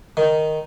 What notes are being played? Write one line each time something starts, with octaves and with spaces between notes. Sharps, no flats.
D#3